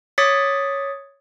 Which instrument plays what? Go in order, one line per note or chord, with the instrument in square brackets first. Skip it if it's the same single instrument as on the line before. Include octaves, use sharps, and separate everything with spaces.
[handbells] C#5 D6 D#6 A6 B6 C#7